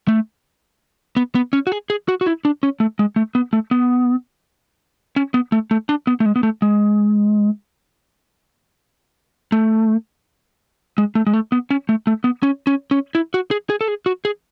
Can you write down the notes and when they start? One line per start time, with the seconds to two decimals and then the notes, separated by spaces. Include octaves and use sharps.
0.08 A3
1.17 B3
1.35 B3
1.53 C#4
1.67 F#4
1.72 G#4
1.90 G#4
2.08 F#4
2.21 F#4
2.26 E4
2.45 D4
2.63 C#4
2.80 A3
2.99 G#3
3.16 A3
3.35 B3
3.53 A3
3.71 B3
5.16 C#4
5.34 B3
5.52 A3
5.71 A3
5.89 D4
6.07 B3
6.20 A3
6.26 G#3
6.36 B3
6.43 A3
6.62 G#3
9.52 A3
10.98 G#3
11.15 A3
11.27 G#3
11.34 A3
11.52 B3
11.70 C#4
11.89 A3
12.07 A3
12.24 B3
12.43 C#4
12.67 C#4
12.91 C#4
13.15 E4
13.34 F#4
13.51 G#4
13.70 G#4
13.81 A4
13.88 G#4
14.06 F#4
14.25 G#4